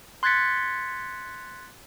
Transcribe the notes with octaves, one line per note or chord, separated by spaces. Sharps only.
C6 F#6 G#6 A6 B6 C#7